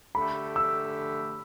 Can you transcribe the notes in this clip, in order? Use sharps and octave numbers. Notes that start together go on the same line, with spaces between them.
D3 A3 G4 B5
E6